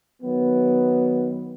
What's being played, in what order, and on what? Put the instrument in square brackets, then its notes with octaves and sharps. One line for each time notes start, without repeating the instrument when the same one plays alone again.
[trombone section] D#3 F#3 B3